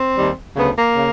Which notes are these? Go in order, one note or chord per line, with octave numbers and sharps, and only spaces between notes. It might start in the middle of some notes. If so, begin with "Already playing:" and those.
Already playing: C4
D#2 D#3 G3
D2 C#3 F#3 B3
A#3
C#3